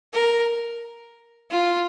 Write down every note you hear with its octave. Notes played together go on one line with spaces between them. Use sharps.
A#4
F4